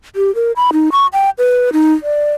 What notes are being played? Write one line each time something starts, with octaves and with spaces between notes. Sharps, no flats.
G4
A#4
B5
D#4
C#6
G5
B4
D#4
D5